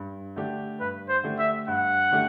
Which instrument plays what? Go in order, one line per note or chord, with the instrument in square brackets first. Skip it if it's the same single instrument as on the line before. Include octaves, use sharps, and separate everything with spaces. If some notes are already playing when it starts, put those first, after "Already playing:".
Already playing: [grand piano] G2
D3 A3 D4 G4
[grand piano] G2 [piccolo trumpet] B4
[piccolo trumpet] C5
[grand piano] D3 A3 D4 G4
[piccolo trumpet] E5
[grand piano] G2 [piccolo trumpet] F#5
[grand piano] D3 A3 D4 G4